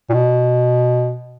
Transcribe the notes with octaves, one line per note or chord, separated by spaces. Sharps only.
A#2
B2